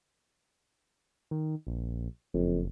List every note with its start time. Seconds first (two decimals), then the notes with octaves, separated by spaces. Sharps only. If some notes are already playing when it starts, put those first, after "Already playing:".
1.31 D#3
1.67 A#1
2.34 F#1 F2